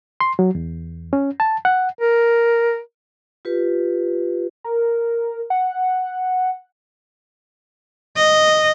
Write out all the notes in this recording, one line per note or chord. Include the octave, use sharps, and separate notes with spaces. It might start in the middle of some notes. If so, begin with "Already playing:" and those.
C6
F#3
E2
C#4
A5
F#5
A#4
F4 G4 B4
A#4
F#5
D#5